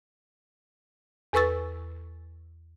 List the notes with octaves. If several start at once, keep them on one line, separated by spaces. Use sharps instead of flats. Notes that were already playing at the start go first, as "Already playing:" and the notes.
E2 A4 B4 C#6 E6 A6